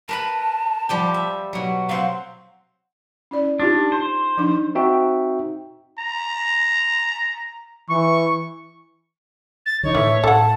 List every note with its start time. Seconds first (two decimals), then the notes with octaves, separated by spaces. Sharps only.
0.09 A#4 B4 A5 B5
0.89 F3 G3 G5
1.14 E5
1.53 B2 F#3
1.89 F#3 C4 F5
3.31 C#4 E4 D5
3.60 D4 D#4 F4 G4
3.92 C5
4.37 F3 D4 D#4
4.75 C4 D#4 F#4 E5 G5
5.98 A#5
7.90 E3 C#6
9.66 A6
9.83 D3 E3 D#4 C#5
9.95 A2 E3 A3 E5
10.24 A2 A4 F#5 A5